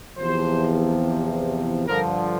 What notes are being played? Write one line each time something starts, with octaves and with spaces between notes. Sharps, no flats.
E2 C3 F3 C5
G2 D3 F3 A#4